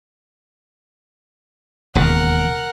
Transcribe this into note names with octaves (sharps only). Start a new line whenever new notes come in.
E1 D#2 C#3 A#4 F#5